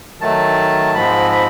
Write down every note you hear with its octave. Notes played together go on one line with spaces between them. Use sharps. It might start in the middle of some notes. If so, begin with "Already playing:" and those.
D#3 F#3 A3 A5
G#2 F3 G#3 C4 B5
B5